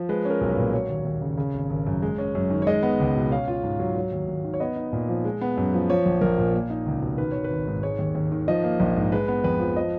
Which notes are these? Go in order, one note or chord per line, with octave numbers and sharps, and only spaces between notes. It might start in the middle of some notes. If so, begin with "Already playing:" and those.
Already playing: F3
G#3 B4
C#4
A#4
B1
B4
A#2
F#3 C#5
D#2
D#2
C#3
C#3
G#1
G#1
F#2
G#3
C#4
F#2
D#3
C#5
G#3 D#5
B3
C#2
B2
C#4 F5
F4
G#2
F#3
F#3
D#2
D#2
D#3
C#5
B3 D#5
D#4
A#2
F3
G#3
B3
F#2
F3
F3 C#5
A#1
A#1 A#4
A#2
A#3
D#4
C#2
B2
D#3 B4
G#1 C#5
B4
G#1
G#2
G#3 C#5
D#2
D#2
D#3
F3 D#5
A#3
A#1
G#2
G#3 B4
B3
F2 B4
F3
F3 D#5